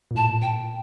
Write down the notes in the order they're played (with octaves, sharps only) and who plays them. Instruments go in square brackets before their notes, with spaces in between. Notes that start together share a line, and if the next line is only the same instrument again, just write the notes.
[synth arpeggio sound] A#2
[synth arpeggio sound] A2 [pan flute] A5
[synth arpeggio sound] A#2 [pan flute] G5